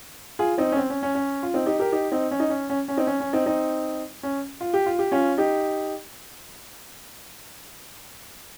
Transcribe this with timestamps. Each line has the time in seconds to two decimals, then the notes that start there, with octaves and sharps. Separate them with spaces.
0.39 F4 G#4
0.58 C4 D#4
0.72 C#4
0.77 C4
0.90 C#4
1.03 C#4
1.15 C#4
1.43 F4
1.54 C4 D#4
1.66 D#4 G4
1.79 G4 A#4
1.92 D#4 G4
2.12 C4 D#4
2.31 C#4
2.40 D#4
2.50 C#4
2.70 C#4
2.88 C#4
2.97 C4 D#4
3.07 C#4
3.20 C#4
3.33 C4 D#4
3.46 C4 D#4
4.23 C#4
4.61 F4
4.74 G4
4.86 F4
4.99 G4
5.12 C#4 F4
5.38 D#4 G4